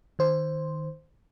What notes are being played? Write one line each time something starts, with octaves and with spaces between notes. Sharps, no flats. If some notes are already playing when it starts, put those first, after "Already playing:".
D#3 C5